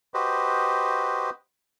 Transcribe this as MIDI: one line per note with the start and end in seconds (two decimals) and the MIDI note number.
0.14 1.30 66
0.14 1.30 67
0.14 1.30 71
0.14 1.30 72
0.14 1.30 75